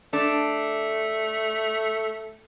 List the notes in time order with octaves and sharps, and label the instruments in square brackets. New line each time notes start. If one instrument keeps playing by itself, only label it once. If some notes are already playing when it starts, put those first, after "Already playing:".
[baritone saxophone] A3 [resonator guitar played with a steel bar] D4